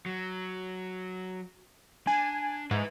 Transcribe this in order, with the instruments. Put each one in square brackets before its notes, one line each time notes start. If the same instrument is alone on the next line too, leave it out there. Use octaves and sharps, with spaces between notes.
[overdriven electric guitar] F#3
[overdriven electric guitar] D4 [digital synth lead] G#5
[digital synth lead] G#2 [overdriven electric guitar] B4 E5